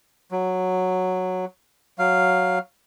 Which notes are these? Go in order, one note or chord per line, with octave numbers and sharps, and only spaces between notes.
F#3
F#3 F5